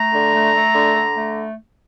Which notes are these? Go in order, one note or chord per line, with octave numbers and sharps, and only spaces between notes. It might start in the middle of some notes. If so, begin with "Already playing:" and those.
Already playing: A3 A#5
D3
A3
A3
D3
D3
A3